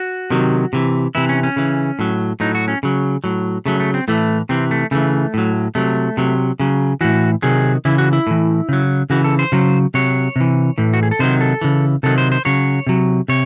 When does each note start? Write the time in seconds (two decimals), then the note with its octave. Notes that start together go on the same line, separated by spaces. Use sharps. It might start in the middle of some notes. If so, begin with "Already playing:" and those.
Already playing: F#4
0.30 C3 D#3 F#3
0.73 C3 E3
1.15 C3 E3 E4
1.29 C#4
1.43 C#4
1.56 C#3 E3
1.99 A2 F#3
2.40 A2 F#3 D#4
2.55 F#4
2.68 C#4
2.83 C#3 F#3
3.24 A2 F#3
3.66 C#3 F#3 A3
3.80 A3
3.94 C4
4.08 A2 E3 A3
4.49 C3 E3 C4
4.71 A3
4.91 C#3 E3 A3
5.34 A2 F#3
5.75 C3 F#3 A3
6.17 C3 F#3
6.60 C#3 F#3
7.01 A2 E3 F#4
7.42 C3 D#3 F#3 G#4
7.85 C#3 E3 E4
7.98 F#4
8.13 E4
8.27 A2 E3
8.69 C#3 F#3
9.10 C#3 E3 F#4
9.24 A4
9.39 C5
9.52 C#3 F#3
9.94 C3 F#3 C#5
10.36 C3 E3
10.78 A2 E3
10.94 F#4
11.03 G#4
11.11 A4
11.19 C3 D#3 F#3 C5
11.41 A4
11.61 C#3 E3
12.03 C3 D#3 F#3 A4
12.18 C5
12.32 C5
12.45 C#3 F#3 C#5
12.87 C3 F#3
13.28 C3 C#5